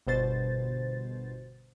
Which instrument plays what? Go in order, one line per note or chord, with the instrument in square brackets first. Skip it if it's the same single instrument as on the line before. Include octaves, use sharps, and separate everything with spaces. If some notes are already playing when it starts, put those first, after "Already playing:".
[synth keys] G1 B2 C5 A6